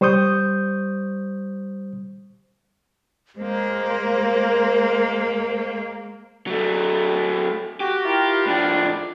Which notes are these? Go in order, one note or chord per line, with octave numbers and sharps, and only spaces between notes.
G3 C5 C#6 D#6 G6
G#3 A#3 A#4 C5
F#3 A3
F#4 G4
E4 F4 A#4
A2 F3 D4